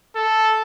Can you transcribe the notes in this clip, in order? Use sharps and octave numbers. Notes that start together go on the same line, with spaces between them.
A4